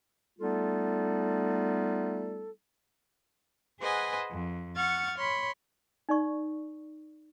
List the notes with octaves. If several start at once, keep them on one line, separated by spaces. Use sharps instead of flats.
G3 A3 B3 D#4 F4 A4
G#4 B4 C5 D#5 F#5 G#5
F2
F#5 C#6 F6 G#6 A6
C#5 B5 C6
D#4 D5 C#6